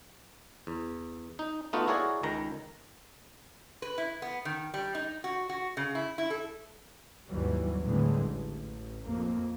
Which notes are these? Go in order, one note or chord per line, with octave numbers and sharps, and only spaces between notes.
E2
D#4
A3 B3 D#4 F4 F#4
E4 F#4 G#4 A#4 C#5 D5
C#2 D#3 A#5
B4
E4
B3
D#3
G3
D#4
F#4
F#4
C#3
E4
E4
A4
G#1 D#2 E3 F#3 G3
A2 D3 E3 G3 G#3 C4
A1
F2 A#3